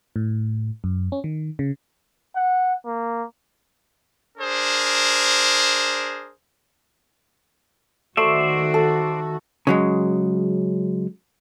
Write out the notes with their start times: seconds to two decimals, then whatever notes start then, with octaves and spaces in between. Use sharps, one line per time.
0.16 A2
0.84 F#2
1.12 C#4
1.24 D#3
1.59 C#3
2.36 F#5
2.85 A#3
4.38 D4 G#4 A#4 C5
8.17 D#3 A3 F#4 C5 D5 E5
8.74 A4
9.67 C#3 F#3 G#3